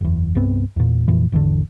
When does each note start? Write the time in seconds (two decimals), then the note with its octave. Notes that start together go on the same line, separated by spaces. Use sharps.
0.01 F#1 E2
0.35 C2 G2 B3 C4
0.76 E2 A#2
1.08 F1 F2 A#2 E3
1.32 G#1 E2 B2 D3